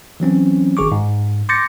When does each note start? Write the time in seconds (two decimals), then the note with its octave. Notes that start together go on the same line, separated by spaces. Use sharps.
0.20 E3 F#3 C4 C#4
0.77 G#1 D#3 G#4 C#6 D6
0.92 G#2
1.49 C6 D6 G6 A6 A#6 C#7